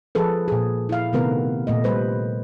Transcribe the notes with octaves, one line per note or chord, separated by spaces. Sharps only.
F3 G#4 A4 B4
A#2 G#4
E4 F5
C3 D#3 A3 B3 A#4 B4
A#2 A3 D#5
G3 B4 C5